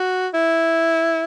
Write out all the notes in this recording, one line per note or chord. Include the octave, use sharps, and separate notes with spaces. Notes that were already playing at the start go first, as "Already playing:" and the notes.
Already playing: F#4
E4